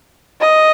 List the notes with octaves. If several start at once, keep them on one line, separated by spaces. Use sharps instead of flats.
D#5